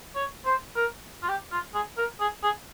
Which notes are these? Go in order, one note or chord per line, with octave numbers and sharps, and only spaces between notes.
C#5
C5
A#4
F4
G4
F4
G#4
A#4
G#4
G#4